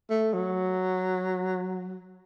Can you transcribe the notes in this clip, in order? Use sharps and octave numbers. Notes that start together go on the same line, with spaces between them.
A3
F#3